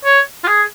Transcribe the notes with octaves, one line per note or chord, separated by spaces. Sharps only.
C#5
F4
G#4